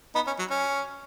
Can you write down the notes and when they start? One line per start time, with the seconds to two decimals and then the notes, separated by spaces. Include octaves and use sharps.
0.15 B3 D#4
0.26 C#4
0.39 F#3
0.50 C#4